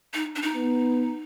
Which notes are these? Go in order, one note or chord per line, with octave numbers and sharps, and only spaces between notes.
D#4
D4
D#4
B3